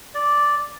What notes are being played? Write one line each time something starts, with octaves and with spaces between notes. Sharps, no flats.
D5